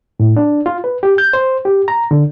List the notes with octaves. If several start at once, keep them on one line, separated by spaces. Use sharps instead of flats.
A2
D4
F4
B4
G4
G6
C5
G4
A#5
D3